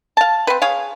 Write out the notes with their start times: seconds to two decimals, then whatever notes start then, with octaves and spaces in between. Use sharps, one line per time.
0.17 F5 A5
0.47 C4 B4
0.62 G#4 C#5 F5